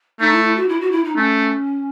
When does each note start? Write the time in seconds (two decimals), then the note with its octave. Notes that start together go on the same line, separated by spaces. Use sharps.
0.20 A3 D#4
0.32 E4
0.45 E4
0.56 F#4
0.69 E4
0.81 F#4
0.91 E4
1.04 D#4
1.16 A3 C#4